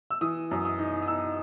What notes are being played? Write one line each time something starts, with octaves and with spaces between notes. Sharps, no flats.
E6
E3 D#6
F#2
D#6
D#4
D#6
D#4 E6